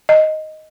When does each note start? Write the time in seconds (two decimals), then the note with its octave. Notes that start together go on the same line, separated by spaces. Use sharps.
0.09 D#5